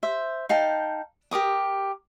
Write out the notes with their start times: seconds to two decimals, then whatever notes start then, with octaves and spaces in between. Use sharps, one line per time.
0.03 C5 E5
0.49 D#4 F5 G5 A5
1.31 G4 A#4 D6 D#6